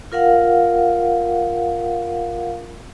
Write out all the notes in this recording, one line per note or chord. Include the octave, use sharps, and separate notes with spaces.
F4 A#4 F5 F#5